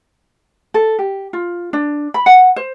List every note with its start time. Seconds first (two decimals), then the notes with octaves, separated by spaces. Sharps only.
0.74 A4
0.99 G4
1.33 F4
1.73 D4
2.14 B5
2.26 F#5
2.56 C5